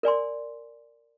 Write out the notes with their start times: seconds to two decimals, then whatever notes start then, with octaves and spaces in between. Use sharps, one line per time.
0.03 A#4 D5 G#5 C6